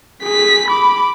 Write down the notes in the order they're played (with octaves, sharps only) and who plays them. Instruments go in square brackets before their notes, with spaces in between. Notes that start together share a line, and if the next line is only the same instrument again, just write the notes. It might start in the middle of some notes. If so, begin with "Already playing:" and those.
[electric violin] G#4 B6
B5 D6